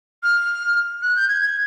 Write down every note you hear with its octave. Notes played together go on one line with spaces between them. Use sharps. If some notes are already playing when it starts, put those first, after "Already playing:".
F6
F#6
G6
G#6
G#6